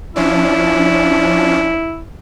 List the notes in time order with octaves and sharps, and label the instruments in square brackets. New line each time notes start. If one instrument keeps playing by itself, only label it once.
[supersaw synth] F3 C#4 D4 [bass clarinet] E4